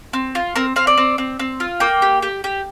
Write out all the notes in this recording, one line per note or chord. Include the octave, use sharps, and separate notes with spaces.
C4
F4
C4 A#4
C4 F5
D5
C4
C4
C4
F4
A#3 G5
G4
G4
G4